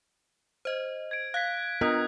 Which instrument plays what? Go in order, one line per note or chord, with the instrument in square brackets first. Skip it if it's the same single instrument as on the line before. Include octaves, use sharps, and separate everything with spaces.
[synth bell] C5 D#5
[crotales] G#6 D7
[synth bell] F5 [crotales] F#6 G#6 B6
[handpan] B3 A#4 D#5 [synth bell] D4 F4 [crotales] D#6 F#6 B6